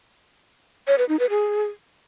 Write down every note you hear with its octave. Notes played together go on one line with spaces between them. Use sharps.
C#5
B4
D#4
B4
G#4